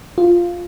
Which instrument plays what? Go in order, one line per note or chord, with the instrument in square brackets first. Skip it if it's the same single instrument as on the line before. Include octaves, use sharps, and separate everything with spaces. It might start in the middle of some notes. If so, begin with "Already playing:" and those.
[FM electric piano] F4